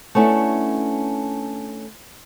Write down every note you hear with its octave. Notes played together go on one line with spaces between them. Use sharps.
A3 B3 C#4 D4 E4